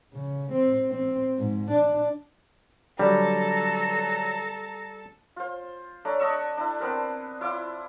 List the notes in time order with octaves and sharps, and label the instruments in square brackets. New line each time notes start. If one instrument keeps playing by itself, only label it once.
[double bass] C#3
C4
C4
G#2
D4
[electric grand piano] D3 F#3 [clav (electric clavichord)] G3 [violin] A4 [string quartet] A#5
[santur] F4 C5
A3 D4 C#5 A#5
D4 D#5 C#6 E6
D4 E4
B3 C4 A#4
E4 F4 C6 D6